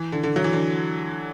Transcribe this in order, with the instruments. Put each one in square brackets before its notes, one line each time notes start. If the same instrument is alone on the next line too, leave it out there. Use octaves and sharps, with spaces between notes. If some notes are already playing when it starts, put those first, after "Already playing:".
Already playing: [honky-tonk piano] E3
D3
D3
F#3
E3
D3